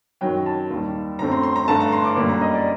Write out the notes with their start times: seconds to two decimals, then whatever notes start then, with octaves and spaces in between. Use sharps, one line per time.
0.21 F#2 D#3 F#3 G5
0.46 A5
0.70 D#2 D#3 G3
1.19 F#2 D3 A3 C4 A#5
1.32 C6
1.43 C6
1.56 A#5
1.68 G2 D3 A3 A5
1.80 A#5
1.92 C6
2.05 D6
2.16 F#2 D3 G3 A#3
2.29 A#5
2.41 D#5
2.54 D5